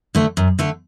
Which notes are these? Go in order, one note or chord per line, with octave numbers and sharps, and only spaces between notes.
D3 A3
F#2
D3 A3